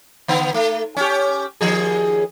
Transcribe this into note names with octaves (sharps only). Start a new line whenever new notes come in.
D3 B3
A3
C#4 G4
D#2 F3 G#4